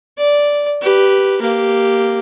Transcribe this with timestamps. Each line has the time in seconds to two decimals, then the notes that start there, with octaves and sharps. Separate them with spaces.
0.18 D5
0.82 G4 B4
1.42 A#3 G4